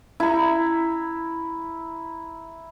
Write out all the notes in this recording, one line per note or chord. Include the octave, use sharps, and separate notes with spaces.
E4 A#5